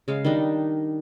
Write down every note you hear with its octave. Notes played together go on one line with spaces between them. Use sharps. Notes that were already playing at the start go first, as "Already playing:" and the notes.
C#3 G#3 F5
D#3 G3 D4 D#4